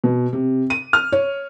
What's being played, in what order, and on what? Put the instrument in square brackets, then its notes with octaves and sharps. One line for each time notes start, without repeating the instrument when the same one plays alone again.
[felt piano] B2
C3
D#7
F6
C#5